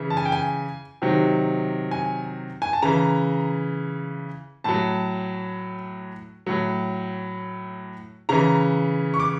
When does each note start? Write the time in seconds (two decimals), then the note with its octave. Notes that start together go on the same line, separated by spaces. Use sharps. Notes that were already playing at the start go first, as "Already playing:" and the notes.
Already playing: C#3 E3
0.10 A5
0.17 G#5
0.25 G5
0.32 G#5
1.02 C3 D#3 F#3
1.91 G#5
2.62 G#5
2.73 A5
2.82 C#3 E3 A#5
4.64 A2 F#3 A5
6.46 A2 F#3
8.29 C#3 E3 A#5
9.14 C#6
9.20 D6